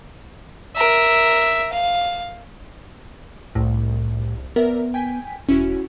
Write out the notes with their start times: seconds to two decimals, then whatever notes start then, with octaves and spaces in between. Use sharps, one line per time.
0.76 A#4 E5
1.72 F5
3.55 C2 A2
4.56 B3 A#4 D5 E5
4.94 G5 G#5 B6
5.49 E1 C#4 E4 F#4